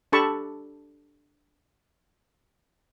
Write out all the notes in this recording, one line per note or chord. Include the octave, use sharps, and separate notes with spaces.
D4 G4 A4 A5 B5 C#6